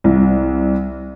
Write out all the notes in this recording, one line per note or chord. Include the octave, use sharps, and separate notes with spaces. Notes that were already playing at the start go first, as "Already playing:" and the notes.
C2